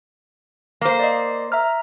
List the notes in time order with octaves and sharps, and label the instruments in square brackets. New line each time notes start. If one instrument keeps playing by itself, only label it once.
[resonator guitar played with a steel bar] A#3 C5 [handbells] F5
[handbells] D5 D#5
E5 A#5 F6